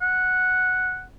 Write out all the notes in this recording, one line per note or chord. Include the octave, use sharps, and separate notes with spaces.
F#5